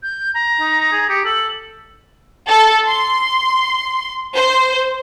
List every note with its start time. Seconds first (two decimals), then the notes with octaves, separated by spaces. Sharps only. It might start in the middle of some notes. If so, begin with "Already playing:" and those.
0.03 G6
0.34 A#5
0.60 D#4
0.92 G#4
1.09 G4 C#7
1.25 A4 F#7
2.48 A4
2.87 C6
4.34 C5